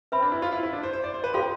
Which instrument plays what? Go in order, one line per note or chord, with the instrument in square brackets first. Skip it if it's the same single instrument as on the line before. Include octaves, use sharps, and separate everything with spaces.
[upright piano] C4 [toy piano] B4 E5 B5
[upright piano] D4
E4
F4
E4
E4
D4
C5
C5
D5
C5
B4
[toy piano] F4 A4 C5 F5 C6 [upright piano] G4